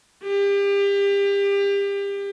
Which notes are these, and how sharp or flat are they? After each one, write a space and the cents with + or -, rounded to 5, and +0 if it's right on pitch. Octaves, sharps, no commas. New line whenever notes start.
G4 +30